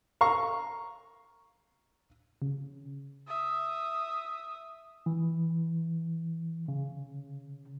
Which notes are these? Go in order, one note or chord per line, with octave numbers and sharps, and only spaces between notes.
F5 A#5 C#6
C#3
E5 D#6
E3
C#3